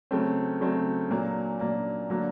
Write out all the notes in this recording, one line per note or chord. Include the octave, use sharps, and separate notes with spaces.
C#3 F#3 A3 C4
C#3 F#3 A3 C4
A#2 F#3 A#3 D4
A#2 F#3 A#3 D4
D3 F#3 A#3 D4